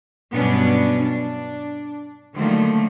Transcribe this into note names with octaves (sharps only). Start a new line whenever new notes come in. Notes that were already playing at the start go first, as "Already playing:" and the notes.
G2 B2 F#3 B3 C#4 D4
D4
D3 D#3 F3 F#3 A3 A#3